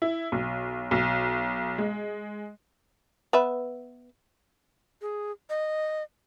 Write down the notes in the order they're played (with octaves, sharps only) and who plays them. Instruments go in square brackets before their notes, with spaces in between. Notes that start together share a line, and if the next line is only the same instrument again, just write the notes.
[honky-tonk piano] E4
B1
B1
G#3
[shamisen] B3 B4 E5
[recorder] G#4
D#5